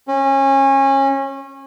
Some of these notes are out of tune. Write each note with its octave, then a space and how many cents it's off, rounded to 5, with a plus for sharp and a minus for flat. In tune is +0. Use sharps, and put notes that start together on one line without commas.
C#4 -25